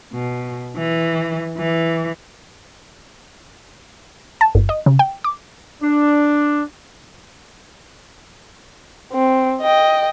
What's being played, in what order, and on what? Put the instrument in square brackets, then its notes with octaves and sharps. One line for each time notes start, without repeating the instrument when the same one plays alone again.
[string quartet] B2
E3
E3
[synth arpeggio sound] A5
G1
D#5
C#3
G5
D6
[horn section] D4
[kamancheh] C4
D#5 G5